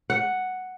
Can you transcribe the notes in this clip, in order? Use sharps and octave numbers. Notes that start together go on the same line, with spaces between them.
F#5